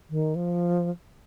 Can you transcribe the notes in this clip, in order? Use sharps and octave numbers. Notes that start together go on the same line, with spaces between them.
D#3
F3